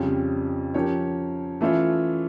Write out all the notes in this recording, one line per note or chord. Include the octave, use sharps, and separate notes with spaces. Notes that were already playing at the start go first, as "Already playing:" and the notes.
Already playing: F2 C#3 G3 C#4 F4
F3 C#4 G4 A#4 C#5
E3 A3 C#4 F4 C#5